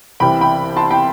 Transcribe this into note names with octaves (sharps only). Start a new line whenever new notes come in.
C2 C3 E3 G5 B5
G5 B5
A5 C6
G5 B5